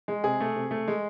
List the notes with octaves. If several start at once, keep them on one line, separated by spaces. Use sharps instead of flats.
G#3
C3 G#4
A3
C3
A3
G#3